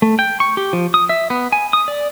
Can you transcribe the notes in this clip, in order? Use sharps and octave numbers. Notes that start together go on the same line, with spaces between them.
A3
G5
C#6
G4
F3
D#6
E5
B3
G#5
D#6
D5